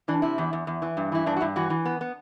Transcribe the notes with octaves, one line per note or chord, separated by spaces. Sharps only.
E3 D4
C3 E4
E2
E2
E2
E3
G2
E3 E4
G2 D4
F#4
G2 E4
E3 F#4
E3
B3
B3